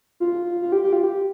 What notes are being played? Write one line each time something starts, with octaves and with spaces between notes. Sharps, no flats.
F4
F4
G4
G4
F4
G4